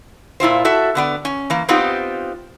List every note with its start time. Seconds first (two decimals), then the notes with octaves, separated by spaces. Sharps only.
0.40 A#2 E4 F4 C5
0.65 F#4 A4 E5
0.95 D3 B3 D5
1.25 C#4
1.50 E3 A#3
1.69 B3 C4 D#4 F4 G4